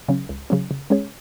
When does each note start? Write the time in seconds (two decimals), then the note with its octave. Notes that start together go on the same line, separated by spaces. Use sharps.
0.08 C#3 F#3 C#4
0.29 C#2
0.50 C#3 F#3 C#4
0.71 C#3
0.90 G#3 C#4 G#4 C#5